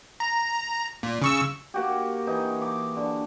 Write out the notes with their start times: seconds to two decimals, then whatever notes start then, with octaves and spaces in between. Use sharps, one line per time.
0.20 A#5
1.03 A#2
1.22 C#3 C#6 E6
1.74 A#3 F#4 G4
2.27 E3 D#4
2.62 D6
2.96 D3